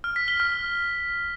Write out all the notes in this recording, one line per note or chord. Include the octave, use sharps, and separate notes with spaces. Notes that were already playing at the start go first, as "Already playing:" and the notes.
F6
B6
G7
F6